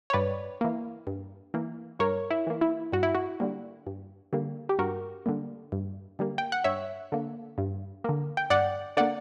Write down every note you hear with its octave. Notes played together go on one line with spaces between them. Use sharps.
C#5
G2 B4 D5
E3 A#3
G2
E3 A#3
G2 A#4 C#5
E4
E3 A#3
E4
G2 F#4
E4
F#4
D3 G3 A#3
G2
D3 G3 A#3
G4
G2 F#4 A#4
D3 G3 A#3
G2
D3 G3 A#3
G5
F#5
G2 C#5 E5
D3 A#3
G2
D3 A#3
G5
G2 D5 F#5
D3 A#3 D5 F#5